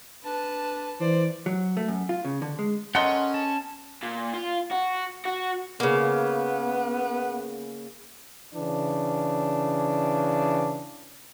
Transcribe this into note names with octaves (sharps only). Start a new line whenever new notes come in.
D4 B4 A5
E3 C5 D5
F#3
A3
F#2
F4
C#3
D3
G#3
C#4 A4 A#4 D#5 F#5 C6
A5
A#2
F4
F#4
F#4
C#3 A#3 B3
C#3 E3 D4